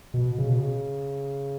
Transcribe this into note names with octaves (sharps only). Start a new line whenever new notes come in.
B2
C#3
B2
C#3